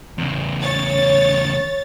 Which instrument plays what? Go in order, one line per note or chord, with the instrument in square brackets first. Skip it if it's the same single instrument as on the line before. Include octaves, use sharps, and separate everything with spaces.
[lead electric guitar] E2 C#3
[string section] C#5 A6